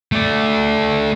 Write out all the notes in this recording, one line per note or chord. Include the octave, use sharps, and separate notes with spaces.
A3 D5